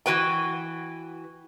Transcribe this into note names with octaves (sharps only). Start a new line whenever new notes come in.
E3 F#4 B4 G5